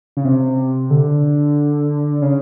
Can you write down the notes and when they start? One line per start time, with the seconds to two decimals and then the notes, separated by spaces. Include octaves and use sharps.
0.17 C#3
0.25 C3
0.90 D3
2.22 C#3